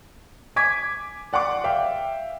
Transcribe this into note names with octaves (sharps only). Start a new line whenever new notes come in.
G#5 D6 G#6 B6
D5 F#5 C6 D6
E5 F5 G5